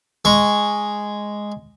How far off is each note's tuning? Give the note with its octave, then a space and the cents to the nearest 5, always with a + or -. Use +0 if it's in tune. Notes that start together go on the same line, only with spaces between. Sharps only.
G#3 +0 C#6 +0